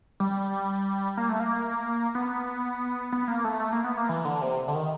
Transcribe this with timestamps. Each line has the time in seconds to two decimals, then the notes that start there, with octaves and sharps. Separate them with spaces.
0.20 G3
1.17 A#3
1.29 A3
1.40 A#3
2.15 B3
3.12 B3
3.28 A#3
3.44 A3
3.60 A3
3.72 A#3
3.84 B3
3.97 A#3
4.09 E3
4.25 D3
4.42 C3
4.68 D3
4.74 D#3